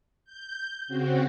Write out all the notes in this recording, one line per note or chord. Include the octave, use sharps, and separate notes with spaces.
G6
C#3 C4 F#4